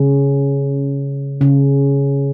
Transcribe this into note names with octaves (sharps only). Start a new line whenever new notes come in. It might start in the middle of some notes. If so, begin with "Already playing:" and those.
Already playing: C#3
C#3